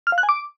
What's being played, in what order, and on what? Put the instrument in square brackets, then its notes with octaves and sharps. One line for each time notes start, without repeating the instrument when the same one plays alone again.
[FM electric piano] F6
F5
F#6
G#5
D6